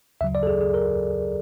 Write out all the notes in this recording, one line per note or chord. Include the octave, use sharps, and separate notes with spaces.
D2 C#3 F#3 E5
D5
A4
G#4
G#4
A#4